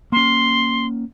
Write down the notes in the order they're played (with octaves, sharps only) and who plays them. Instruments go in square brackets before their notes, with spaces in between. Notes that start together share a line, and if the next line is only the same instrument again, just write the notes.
[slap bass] A#3 C#4 [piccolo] C6